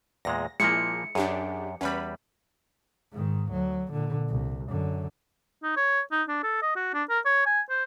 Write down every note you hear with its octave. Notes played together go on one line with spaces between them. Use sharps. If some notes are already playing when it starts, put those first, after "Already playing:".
E2 A#2 G#3 A#6
A#2 F3 G#3 A#3 E4 G#4 C#7
F#2 D4 G4 G#4
E2 G3 C#4 B4 B5
G#2 D#3
D2 F#3
A#2 D3
C2
F#2 D3
D#4
C#5
D#4
D4
A4
D#5
F#4
D4
A#4
C#5
G#5
C5